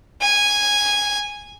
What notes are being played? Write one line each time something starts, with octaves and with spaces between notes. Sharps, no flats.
G#5